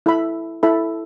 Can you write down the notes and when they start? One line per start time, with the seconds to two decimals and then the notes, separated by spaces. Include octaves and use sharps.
0.06 E4 A4 E5 B5
0.63 E4 A4 E5 B5